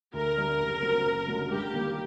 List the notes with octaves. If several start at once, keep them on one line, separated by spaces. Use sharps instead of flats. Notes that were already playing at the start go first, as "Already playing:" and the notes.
D2 A#4
D3 G3 D4
F#1
F#2 D3 F#3 C4
F#1
F#2 D3 F#3 A3
G2 G4
D#3 G3 A#3